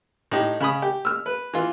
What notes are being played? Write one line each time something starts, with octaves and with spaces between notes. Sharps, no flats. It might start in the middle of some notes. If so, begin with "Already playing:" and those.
A2 D#4 G4
C#3 B5 D#6
G4
E6 F6
B4
E3 F4